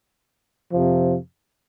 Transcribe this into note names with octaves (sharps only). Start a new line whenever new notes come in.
F2 C3 F3